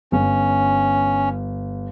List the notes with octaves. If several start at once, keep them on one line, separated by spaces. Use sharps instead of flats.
G1 C#4